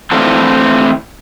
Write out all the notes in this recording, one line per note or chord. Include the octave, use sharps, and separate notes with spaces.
E3 A3 C4 D4 E4 F4